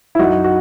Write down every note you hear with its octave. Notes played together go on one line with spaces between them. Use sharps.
E4
F#2 D#4 F#4
F#4